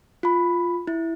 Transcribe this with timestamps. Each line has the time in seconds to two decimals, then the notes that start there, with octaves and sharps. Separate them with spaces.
0.23 F4 B5
0.87 E4